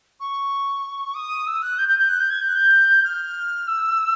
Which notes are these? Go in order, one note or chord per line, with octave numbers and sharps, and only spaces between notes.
C#6
D#6
E6
F#6
G6
G6
G6
F#6
G6
G#6
G6
F#6
G6
F6
E6